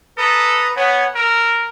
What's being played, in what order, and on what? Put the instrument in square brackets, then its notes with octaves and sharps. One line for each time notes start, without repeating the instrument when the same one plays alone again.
[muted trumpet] A4 [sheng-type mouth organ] B4 A#5 D#6
[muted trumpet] B3 [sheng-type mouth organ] C#5 F#5 G#5
[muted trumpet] A#4 [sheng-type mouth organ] E6